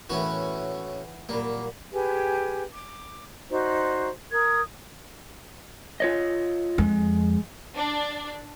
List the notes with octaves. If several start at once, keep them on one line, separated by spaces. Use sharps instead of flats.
A2 E3 B3 C#4 F#4
A#2 F#3 G3 A#3
G4 G#4 B4 G#5
D6
D#4 F#4 C5 D5
A#4 D#6 G#6
F4 C#5 D#5
F2 G#3
D4